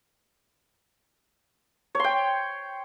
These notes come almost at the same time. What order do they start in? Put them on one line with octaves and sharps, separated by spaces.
C#5 C6 G5